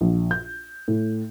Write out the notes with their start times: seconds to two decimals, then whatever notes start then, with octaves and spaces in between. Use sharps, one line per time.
0.01 A#1
0.31 G6
0.88 A2